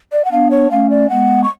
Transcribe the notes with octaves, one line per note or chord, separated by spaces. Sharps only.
D5
F#5
B3 D4 F5
C#5
A3 C#4 F5
D5
G#3 B3 F#5
C#6